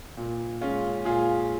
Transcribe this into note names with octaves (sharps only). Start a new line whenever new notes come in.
A#2
G#3 C#4 F4
A#2 F4 G#4